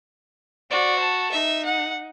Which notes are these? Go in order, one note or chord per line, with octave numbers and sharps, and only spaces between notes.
F#4 C5 D5
A5
D#4 E5
F#5